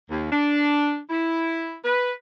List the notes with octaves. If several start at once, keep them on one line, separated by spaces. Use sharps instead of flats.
D#2
D4
E4
B4